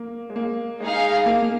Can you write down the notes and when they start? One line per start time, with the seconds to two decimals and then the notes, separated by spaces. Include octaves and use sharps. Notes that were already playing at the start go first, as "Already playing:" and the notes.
Already playing: A#3
0.30 G#3
0.36 A#3
0.80 G#3 D#4 G#4 F5
1.26 A#3
1.42 A#3